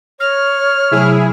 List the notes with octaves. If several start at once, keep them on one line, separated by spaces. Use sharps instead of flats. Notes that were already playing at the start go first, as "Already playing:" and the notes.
C#5 F6 A#6
C3 F#3 A3 E4 G#4